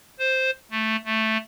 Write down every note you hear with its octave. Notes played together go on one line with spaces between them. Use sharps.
C5
A3
A3